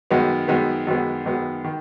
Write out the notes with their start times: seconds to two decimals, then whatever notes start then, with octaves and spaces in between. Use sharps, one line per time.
0.11 F#2 D#3 G#3 B3
0.48 F#2 D#3 G#3 B3
0.87 F#2 D#3 G#3 B3
1.25 F#2 D#3 G#3 B3
1.64 D#3